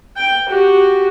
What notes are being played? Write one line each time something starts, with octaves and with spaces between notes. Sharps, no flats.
G5
F#4 G4